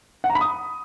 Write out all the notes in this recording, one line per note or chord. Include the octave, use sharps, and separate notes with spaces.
F#5
A#5
B5
D#6